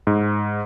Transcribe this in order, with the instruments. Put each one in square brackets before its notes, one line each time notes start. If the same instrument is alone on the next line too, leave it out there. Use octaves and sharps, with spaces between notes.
[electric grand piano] G#2